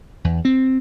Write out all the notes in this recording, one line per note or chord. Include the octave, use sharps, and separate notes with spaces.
E2
C4